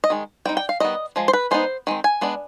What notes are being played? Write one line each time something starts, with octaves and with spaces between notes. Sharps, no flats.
D#5
D#3 G#3
G3 C4 D#4 G5
G5
F5
D#3 G3 B3 D#5
F3 G#3
C5
B4
G#3 B3 D#4 C5
D#3 G#3 C4
G#5
G#3 B3 D4